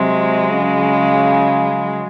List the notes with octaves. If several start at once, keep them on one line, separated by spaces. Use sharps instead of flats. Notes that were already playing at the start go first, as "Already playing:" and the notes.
Already playing: C3 F#3 G#3
C#3